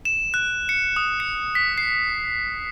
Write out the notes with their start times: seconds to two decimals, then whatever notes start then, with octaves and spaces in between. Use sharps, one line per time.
0.05 E7
0.34 F#6
0.69 C#7
0.96 D#6
1.20 C#7
1.55 B6
1.78 C7